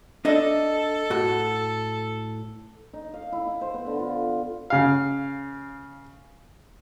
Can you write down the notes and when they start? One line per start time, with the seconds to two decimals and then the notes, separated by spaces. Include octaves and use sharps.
0.25 D4 A4 D#5 E5
1.10 A2 F#4
2.93 D#4
3.14 F5
3.32 E4
3.47 E4
3.61 C5
3.74 B3
3.86 D3
3.99 F4
4.70 C#3 F5